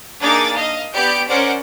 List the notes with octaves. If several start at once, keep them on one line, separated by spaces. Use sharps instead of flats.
A#3 D4 D#4 G#4 D6 A6
D#5 F5
B3 G4 D5 G6 D7
C#4 A#4 C5 D5 F#5 D7